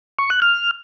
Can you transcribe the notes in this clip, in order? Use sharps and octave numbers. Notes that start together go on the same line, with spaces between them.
C#6
F#6
F6